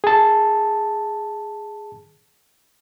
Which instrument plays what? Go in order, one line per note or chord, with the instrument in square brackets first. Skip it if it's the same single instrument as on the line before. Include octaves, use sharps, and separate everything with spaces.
[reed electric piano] G#4 A5